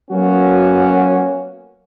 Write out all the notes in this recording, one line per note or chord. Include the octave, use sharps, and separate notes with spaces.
F#3 A#3 B3 C#4 F#4